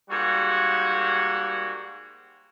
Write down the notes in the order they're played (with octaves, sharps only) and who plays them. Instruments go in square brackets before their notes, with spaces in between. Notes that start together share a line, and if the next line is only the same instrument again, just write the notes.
[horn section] G#2 G3 A#3 F#4